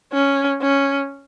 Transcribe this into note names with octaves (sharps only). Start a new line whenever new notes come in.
C#4
C#4